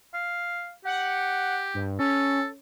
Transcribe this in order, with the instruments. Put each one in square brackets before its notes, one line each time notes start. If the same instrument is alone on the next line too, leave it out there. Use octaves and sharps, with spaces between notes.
[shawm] F5
[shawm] G4 [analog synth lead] F#5
[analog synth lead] G2
[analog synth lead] C#4 [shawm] A4